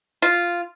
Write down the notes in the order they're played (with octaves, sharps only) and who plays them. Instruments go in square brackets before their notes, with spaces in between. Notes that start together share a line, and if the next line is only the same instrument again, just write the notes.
[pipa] F4